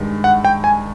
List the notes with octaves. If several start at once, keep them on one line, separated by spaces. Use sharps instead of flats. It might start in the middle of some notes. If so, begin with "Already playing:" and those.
Already playing: G2 D#3 G#3
F#5
G5
G#5